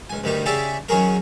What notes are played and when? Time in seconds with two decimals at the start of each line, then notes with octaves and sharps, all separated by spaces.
0.10 C#2 G#5
0.24 D2 G2 D#3 G3 G4
0.46 C#3 G4 G#4 D5 E5 D6
0.89 D#3 F#3 C#4 G#4 A#4